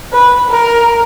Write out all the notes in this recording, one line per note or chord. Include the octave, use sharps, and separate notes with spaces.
B4
A#4